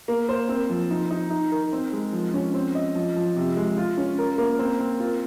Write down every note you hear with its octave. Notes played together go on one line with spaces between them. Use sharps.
A#3
C5
C4
F3
D#4
D#4
D#4
A#4
C4
G#3
F3
C#4
C4
D#5
F3
F3
C3
G#3
F4
C#4
A#4
A#3
C4
C4
F4